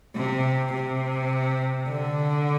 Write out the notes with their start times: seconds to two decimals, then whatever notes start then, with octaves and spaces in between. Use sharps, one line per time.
0.15 C3
0.73 C3
1.89 D3